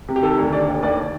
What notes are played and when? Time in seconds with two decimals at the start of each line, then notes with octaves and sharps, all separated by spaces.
0.09 C3
0.16 G4
0.23 D#3 A4
0.38 D2
0.53 D3 D5
0.68 D#2
0.83 D#2 D5